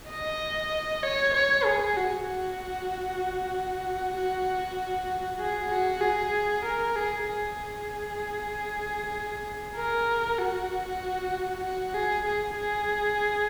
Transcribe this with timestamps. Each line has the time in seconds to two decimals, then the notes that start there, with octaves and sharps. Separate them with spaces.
0.09 D#5
1.03 C#5
1.34 C#5
1.65 G#4
1.97 F#4
2.28 F#4
4.15 F#4
5.39 G#4
5.71 F#4
6.01 G#4
6.65 A#4
6.96 G#4
7.27 G#4
9.76 A#4
10.39 F#4
11.64 F#4
11.94 G#4
12.25 G#4
12.56 G#4